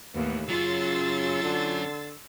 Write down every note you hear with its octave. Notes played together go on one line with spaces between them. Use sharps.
D#2 A2 E3 B3
C#3 F#3 C#4 F4 C6 E6 A6
D3